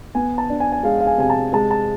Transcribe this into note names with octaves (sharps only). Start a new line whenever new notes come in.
B3 G#5
A5
D4
G#5
G#5
G#3 F5
F5
G#5
C3 G#5
A5
G#3 A5
A5